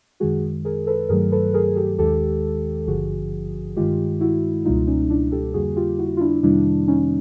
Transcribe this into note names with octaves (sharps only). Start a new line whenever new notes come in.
F#2 D#3 G#3 F#4 G#4
G#4 A#4
A4 B4
G2 D#3 F#3 A3 G#4 A#4
A4 B4
G#4 A#4
G4 A4
D#2 D#3 G#3 G4 A4
G#1 G2 D3 F3 F#4 G#4
G2 D#3 G#3 F4 G4
E4 F#4
C#2 B2 G3 A#3 D#4 F4
C#4 D#4
D4 E4
G4 A4
F2 D3 G3 A#3 F#4 G#4
F4 G4
E4 F#4
F4
D4 E4
F2 C3 D#3 G3 A#3 D4 E4
C#4 D#4